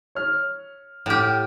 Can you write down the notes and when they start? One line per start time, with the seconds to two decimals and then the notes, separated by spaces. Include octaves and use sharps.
0.15 C#5 F6
1.06 A2 G4 F#5 G5 F6